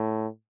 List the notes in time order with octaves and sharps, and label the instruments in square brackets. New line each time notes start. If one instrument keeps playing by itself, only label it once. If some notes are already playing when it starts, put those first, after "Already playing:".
Already playing: [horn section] A2